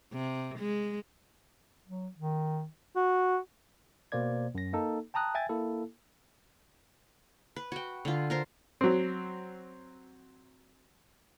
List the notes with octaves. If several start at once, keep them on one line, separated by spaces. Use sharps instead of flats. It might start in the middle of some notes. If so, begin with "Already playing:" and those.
C3
G#3
F#3
D#3
F#4
B2 A#3 C5 D5 G#6
F#2 A#6
A#3 D#4 A4
G5 A5 A#5 D#6 F#6
E5 G5 G#5 G#6 A6
A#3 E4 A4
B4
F#4 G5
D3 F4
F4 A#4 C5
F#3 C4